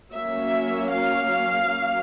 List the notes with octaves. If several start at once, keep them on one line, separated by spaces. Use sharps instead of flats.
F#3 A#3 C#4 E5
F5
F#3 A#3 C#4